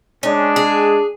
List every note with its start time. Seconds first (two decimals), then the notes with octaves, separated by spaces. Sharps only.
0.23 G#3 C#4 D4
0.56 G#4